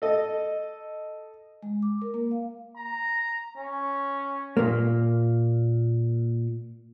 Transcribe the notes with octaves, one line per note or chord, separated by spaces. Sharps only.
A4 D#5
G#3
D6
A#4
A#3
F5
A#5
C#4
A#2 A#3